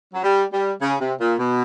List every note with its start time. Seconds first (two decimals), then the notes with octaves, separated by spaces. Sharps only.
0.14 F#3
0.23 G3
0.52 G3
0.81 C#3
1.00 C3
1.20 A#2
1.39 B2